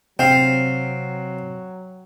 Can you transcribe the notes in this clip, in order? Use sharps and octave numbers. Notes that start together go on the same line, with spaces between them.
C3 F#3 C4 F5 G5